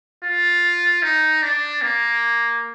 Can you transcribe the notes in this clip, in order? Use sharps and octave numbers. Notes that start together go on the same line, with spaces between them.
F4
D#4
D4
A#3